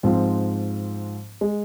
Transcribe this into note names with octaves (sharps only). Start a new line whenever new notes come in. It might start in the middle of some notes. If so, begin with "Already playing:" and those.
G#2 F3 C4 F4
G#3